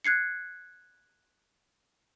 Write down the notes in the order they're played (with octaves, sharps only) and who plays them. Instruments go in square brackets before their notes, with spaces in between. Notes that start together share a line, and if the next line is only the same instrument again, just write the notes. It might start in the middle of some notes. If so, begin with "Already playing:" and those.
[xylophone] F#6 G#6 C7 C#7